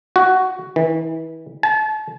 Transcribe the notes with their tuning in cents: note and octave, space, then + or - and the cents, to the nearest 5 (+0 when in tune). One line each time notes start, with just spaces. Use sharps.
F#4 +10
E3 -30
A5 -35